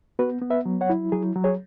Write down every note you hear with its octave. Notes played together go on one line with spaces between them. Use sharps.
B3 F#4 B4
B3
B4 E5
F#3
C#5 F#5
E4
F#3 G#4
F#3
G#4 C#5